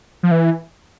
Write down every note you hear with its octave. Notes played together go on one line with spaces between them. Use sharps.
F3
E3